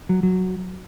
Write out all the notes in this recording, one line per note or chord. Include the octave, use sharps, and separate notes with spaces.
F#3
F#3